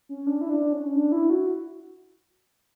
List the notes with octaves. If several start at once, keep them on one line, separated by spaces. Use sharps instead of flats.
C#4
D4
E4
D4
C#4
D4
E4
F#4